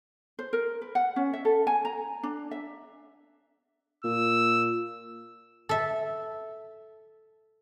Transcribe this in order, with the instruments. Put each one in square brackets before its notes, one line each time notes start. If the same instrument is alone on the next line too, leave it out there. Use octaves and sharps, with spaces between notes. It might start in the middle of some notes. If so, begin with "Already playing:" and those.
[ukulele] C5
A#4
B4
F#5
C#4
E5
A4
G#5
A#5
D4
E5
[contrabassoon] A#2 [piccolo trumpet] E6
[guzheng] A4 E5